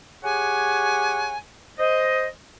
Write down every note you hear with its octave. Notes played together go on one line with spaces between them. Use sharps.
G4 G#4 C#5 F#5 G#5
C5 D#5